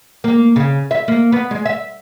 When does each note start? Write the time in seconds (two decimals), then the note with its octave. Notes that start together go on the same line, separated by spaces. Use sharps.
0.24 A#3
0.56 C#3
0.91 E5
1.08 A#3
1.32 B3
1.51 G#3
1.65 E5